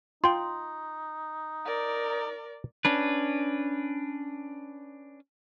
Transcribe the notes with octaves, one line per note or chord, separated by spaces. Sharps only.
D#4 F4 G5 C6
A#4 D5
C#4 D4 B4